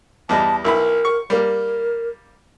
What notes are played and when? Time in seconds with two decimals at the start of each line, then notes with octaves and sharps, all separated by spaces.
0.29 E2 G3 D#5 A5
0.65 B1 E4 A#4 B5
1.05 C#6
1.30 G3 A#3 A#4